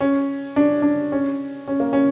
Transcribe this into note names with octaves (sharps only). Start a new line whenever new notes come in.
C#4
D4
D4
C#4
C#4
A#3
C#4